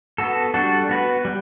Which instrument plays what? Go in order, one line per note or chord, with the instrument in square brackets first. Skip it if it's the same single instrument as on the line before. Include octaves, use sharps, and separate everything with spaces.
[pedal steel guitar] B3 F#4 A4
G3 D4 F#4 A4
B3 F#4 B4
G3